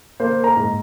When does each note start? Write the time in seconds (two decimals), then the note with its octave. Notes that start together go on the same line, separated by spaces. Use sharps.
0.20 A#3 C5
0.43 A#4 A#5
0.56 G#2